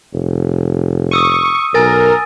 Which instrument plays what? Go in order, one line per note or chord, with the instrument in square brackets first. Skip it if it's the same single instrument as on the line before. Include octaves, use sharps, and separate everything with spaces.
[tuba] F1
[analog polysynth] C#6 [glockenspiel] D#6 E6 D#7
[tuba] B1 [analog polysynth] A#4 [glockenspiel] G#5 A6 A#6